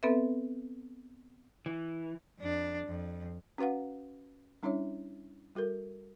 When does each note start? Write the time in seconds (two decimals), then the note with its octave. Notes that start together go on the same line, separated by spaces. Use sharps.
0.03 B3 C4 A4 B4 E5
1.66 E3
2.39 F2 D4
2.86 F2
3.58 C#4 F#4 B4 F5 F#5
4.63 G3 C#4 D4 E4 C#5 E5
5.55 G3 F#4 A4 A#4